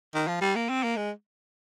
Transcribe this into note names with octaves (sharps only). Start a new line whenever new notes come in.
D#3
F3
G3
A#3
C4
A#3
G#3